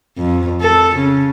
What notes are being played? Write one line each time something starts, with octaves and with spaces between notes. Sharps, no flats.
F2
A4
C#3